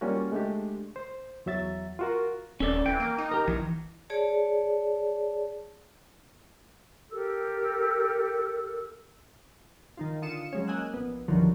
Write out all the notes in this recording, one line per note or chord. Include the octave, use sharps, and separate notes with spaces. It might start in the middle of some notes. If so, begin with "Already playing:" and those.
G3 A#3 C#4 F4 F#4
G#3 A3 D4 G4
C5
E2 F#3 E5 A6
F4 F#4 A#4
D#1 C#4 A4 D5
E3 G5
A#3
D#4
G4 A#4
A#1 E3
G#4 C#5 D5 A5
G4 A4 A#4 E6
D#3 D#4 F4
D3 F4 D#6 C#7 E7
F#3 G#3 C#4
A#3 D#5 G#5 E6 F#6
A#1 B3
C2 G2 D3 D#3 F3 F#3